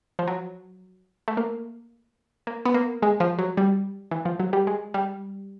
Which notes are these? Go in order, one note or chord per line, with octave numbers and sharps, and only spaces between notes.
F3
F#3
A3
A#3
A#3
B3
A#3
G#3
F3
F#3
G3
E3
F3
F#3
G3
G#3
G3